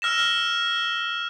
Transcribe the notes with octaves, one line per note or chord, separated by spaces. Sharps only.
E6 F6 A#6 E7